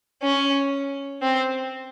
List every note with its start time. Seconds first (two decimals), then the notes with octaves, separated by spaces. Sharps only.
0.22 C#4
1.22 C4